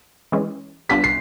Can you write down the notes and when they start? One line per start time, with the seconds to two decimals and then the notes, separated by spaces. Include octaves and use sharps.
0.32 E3 G#3 C#4
0.89 G3 B3 D4 F4 B6
1.04 C7